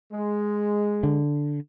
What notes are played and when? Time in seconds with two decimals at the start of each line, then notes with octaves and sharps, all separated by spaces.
0.12 G#3
1.03 D3